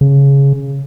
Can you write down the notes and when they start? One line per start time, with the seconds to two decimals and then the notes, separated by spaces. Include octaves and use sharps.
0.01 C#3